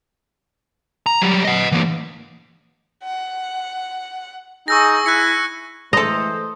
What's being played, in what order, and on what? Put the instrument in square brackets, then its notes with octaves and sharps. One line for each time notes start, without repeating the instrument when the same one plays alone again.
[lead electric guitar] A#5
F#3 G3
D#5 F#5
E3 A#3
[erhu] F#5
[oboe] D#4 [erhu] G#4 [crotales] C#6 E6 A#6
[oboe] E4 [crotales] F#6 C#7
[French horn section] E3 G#3 A3 [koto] A4 A#5 [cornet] C5 [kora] D#5